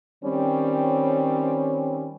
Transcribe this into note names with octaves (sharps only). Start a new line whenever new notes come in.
D#3 G3 C4 C#4 C#5